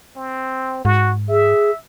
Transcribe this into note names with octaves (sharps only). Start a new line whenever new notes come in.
C4
G#2 F#4
G#4 E5